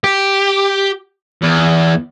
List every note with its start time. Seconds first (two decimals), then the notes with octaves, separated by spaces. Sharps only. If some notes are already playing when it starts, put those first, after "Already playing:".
0.04 G4
1.42 E2